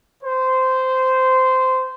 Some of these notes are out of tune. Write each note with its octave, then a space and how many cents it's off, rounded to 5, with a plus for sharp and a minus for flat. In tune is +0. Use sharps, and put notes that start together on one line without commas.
C5 -15